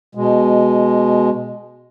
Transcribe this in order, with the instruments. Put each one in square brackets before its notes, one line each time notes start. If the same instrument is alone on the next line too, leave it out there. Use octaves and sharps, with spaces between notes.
[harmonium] B2 G#3